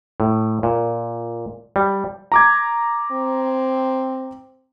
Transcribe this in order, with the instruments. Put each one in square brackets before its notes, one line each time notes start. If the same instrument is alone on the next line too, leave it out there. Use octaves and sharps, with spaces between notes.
[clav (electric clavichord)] A2
A#2
G3
[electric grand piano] A#5 D6 G#6
[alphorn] C4